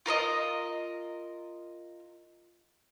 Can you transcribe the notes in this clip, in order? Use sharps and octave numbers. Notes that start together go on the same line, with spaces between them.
F4 A#4 C#5 D#5